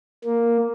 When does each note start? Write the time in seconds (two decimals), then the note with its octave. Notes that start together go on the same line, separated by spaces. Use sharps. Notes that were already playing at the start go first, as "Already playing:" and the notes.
0.25 A#3